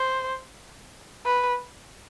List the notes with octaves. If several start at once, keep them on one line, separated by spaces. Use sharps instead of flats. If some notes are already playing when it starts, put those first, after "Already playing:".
Already playing: C5
B4